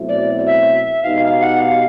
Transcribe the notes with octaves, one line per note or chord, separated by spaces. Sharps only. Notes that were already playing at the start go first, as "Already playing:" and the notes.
Already playing: B2 F#3 A3 C4 E4
D5
E5
B2 G#3 B3 D#4 G4 F5
F5
F#5
F5